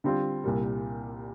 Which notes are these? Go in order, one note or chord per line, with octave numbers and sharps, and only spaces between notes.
D3 G3 C4 F4
C2 A#2 G3